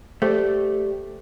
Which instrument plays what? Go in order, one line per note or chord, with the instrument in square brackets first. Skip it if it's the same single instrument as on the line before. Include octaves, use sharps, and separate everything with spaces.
[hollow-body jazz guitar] A3 [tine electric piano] G4 D5 [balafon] C5